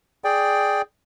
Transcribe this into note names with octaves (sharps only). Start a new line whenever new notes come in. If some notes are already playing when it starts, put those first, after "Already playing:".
G#4 D5 G5